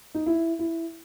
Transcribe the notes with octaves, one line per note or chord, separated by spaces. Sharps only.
D#4
E4
E4